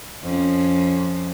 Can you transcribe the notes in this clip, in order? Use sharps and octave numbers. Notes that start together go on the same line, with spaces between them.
F2 C#4